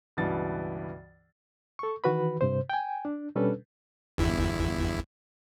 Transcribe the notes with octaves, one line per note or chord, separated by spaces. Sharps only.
C#2 G2 B2 E3 A6
A4 C#6
D#3 E3 F#4 B4 B5
G2 C3 C5
G5 G#5
D4
B2 G3 C#4 D4 A4 B4
G1 E2 E4